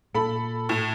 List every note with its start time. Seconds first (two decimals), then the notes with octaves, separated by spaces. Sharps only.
0.14 A#2 A4 B5
0.69 A2